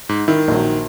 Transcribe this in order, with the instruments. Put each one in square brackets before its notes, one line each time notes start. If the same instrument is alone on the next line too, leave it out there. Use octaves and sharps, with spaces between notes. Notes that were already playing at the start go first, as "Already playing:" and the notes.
[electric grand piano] G#2
[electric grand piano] D#3 [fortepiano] E4
[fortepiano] A#1 F#3